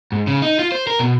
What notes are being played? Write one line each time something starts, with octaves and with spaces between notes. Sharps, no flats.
G#2
C#3
D#4
F4
C5
A#4
B2